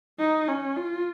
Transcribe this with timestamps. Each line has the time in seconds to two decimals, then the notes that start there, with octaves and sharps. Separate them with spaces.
0.19 D#4
0.48 C#4
0.76 F4